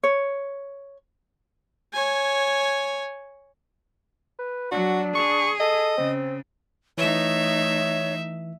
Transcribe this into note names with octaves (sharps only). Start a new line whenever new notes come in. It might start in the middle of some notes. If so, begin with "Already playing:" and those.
C#5
C#5 G#5
B4
F#3 D4 F#4
G#4 C#6
A4 D#5
C#3 C4
E3 A3 D#4 C#5 E5